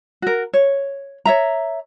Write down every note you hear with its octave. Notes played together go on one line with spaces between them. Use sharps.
F#4 A#4
C#5
C#5 E5 A#5